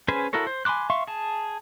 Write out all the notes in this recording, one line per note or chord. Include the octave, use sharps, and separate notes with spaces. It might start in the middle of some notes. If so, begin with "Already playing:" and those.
C#4 G#4 B4 C5 G#5
E4 F#4 A4 A#4 C#5
C5
G#5 B5 C6 D6 F#6
E5 F5 C6 C#6
G#4 A5